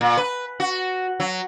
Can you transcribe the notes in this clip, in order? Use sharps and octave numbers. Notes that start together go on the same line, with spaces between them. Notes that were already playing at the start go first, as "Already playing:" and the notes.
A#2
B4
F#4
F#3